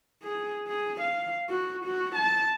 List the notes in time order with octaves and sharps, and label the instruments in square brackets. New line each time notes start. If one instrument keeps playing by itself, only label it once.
[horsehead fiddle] G#4
G#4
F5
F#4
F#4
A5